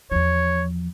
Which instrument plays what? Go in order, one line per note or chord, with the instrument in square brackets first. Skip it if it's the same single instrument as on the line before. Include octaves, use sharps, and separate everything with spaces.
[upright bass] E2 F3 [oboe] C#5